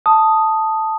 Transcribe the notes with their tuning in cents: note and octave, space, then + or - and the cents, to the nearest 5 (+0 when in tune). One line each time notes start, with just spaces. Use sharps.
A5 +0 D#6 +0